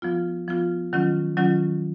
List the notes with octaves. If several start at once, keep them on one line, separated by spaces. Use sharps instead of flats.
F3 B3 F4
F3 B3 F4
D#3 F#3 C#4 F4
D#3 F#3 C#4 F4